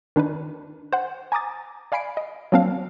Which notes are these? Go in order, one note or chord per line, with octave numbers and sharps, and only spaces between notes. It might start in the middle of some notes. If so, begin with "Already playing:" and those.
D#3 D4 D#4 B4
C5 F#5
G#5 A#5 D6 D#6 A6
D5 F5 G#5 B5 C7 D7
D#5
F#3 A#3 C4 D4 F5